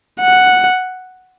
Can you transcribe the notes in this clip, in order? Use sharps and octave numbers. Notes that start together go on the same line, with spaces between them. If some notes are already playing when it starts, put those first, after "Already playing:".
F#5